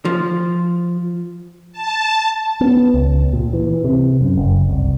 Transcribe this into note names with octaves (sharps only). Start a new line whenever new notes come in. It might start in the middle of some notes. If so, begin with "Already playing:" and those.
F3
A5
B3
C#2
A#2
E3
C3
F#2
F#1
C2